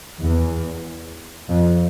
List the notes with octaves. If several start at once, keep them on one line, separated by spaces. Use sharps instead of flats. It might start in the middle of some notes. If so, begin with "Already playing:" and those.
E2
F2